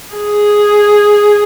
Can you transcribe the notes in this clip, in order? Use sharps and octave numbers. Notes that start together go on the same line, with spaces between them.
G#4